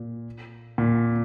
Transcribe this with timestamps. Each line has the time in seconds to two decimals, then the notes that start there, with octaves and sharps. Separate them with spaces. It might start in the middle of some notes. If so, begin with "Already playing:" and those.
Already playing: A#2
0.78 A#2